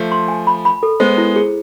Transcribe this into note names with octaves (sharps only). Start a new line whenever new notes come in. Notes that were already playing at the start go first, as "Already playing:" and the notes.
Already playing: F3 A3
C6
G#5
B5
B5
A4
G#3 B3 C5
E4
G#4